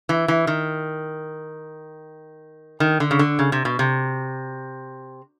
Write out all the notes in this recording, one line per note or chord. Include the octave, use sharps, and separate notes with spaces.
E3
E3
D#3
D#3
D3
C#3
D3
C#3
C3
B2
C3